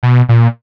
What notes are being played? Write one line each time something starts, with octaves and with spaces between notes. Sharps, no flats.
B2
A#2